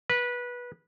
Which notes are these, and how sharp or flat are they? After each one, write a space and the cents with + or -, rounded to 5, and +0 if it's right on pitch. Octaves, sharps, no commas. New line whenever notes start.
B4 -20